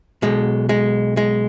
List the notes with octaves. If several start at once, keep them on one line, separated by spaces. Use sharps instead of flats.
B1 B2 G#3
G#3
G#3